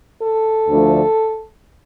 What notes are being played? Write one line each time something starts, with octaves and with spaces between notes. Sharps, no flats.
A4
D2 D3 F3 A3